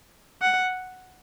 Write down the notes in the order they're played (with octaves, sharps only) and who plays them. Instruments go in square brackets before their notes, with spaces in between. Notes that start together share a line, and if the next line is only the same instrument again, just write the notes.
[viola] F#5